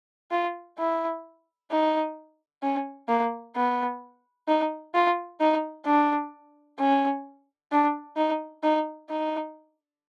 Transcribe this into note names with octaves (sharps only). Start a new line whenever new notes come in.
F4
E4
D#4
C#4
A#3
B3
D#4
F4
D#4
D4
C#4
D4
D#4
D#4
D#4